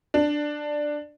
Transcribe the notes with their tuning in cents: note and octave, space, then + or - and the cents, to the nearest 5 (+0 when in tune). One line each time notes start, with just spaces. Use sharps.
D4 +10